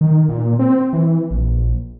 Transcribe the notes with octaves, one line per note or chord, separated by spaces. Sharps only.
D#3
A#2
C4
E3
A#1